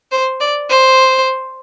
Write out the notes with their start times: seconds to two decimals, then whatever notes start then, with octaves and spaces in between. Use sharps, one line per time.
0.11 C5
0.40 D5
0.69 C5